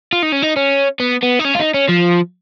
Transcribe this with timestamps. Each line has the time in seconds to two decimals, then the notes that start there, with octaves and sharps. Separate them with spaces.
0.13 F4
0.23 D#4
0.32 C#4
0.42 D#4
0.56 C#4
1.00 B3
1.23 B3
1.39 D#4
1.45 C#4
1.55 F4
1.59 D#4
1.74 C#4
1.89 F3